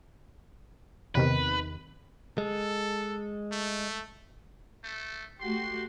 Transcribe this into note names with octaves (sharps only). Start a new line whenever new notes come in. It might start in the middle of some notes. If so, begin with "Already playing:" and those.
E2 C3 D#3 B4
G#3 A4
A3
A3
A3 F#4 G4 C6